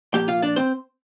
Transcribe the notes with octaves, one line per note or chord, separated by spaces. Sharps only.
A#2 F3 A#3 G4 G5
F4 F5
D4 D5
C4 C5